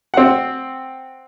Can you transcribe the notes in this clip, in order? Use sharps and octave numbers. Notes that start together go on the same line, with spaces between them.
C4 F#5